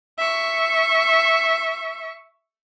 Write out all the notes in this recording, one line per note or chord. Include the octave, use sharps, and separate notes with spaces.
E5 C#6